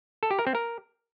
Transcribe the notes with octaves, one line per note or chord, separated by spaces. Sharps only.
A4
G4
A#4
C4
A#4